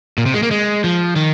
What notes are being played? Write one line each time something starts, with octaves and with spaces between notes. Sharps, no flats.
A#2
C3
G#3
A#3
G#3
F3
D#3